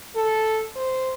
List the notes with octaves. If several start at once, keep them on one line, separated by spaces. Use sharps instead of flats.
A4
C5